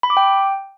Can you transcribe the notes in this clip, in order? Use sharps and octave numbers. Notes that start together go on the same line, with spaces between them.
B5
D6
G5